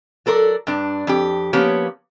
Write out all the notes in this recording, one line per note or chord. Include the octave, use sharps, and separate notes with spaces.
F#3 A4 A#4 C5 D5
G2 D4
F2 G4
F3 A#3 B3 C#4 G4 C#5